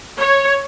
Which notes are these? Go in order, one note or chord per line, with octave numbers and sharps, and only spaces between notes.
C#5